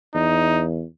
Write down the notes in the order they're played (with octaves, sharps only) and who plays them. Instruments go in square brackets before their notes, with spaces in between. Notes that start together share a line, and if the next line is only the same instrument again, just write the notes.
[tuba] E2 [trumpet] D#4